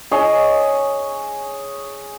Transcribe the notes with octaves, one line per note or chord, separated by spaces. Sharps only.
G#4 C#5 D#5 G#5